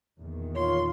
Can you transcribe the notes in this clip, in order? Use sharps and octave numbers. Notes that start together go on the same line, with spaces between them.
E2 A#2 D#3
F4 C#5 C6